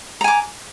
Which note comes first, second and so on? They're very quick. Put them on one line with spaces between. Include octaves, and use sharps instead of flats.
A#5 G#5 D6